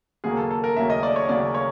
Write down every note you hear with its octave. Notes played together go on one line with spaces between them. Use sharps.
D#2 C#3 F#3 A#3 G#4
A4
A4
A#4
D#2 C#3 F#3 A#3 E5
D#5
D5
C#5
D#2 C#3 F#3 A#3 D5
C#5